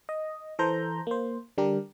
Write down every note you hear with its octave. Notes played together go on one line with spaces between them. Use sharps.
D#5
E3 A4 C5 A#5 G6
A#3 C5
D3 G3 D4 G4 A#4